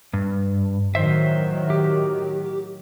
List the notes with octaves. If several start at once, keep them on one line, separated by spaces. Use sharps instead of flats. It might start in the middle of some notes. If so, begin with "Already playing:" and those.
G2
A2 D#3 F#3 C5 E5
G4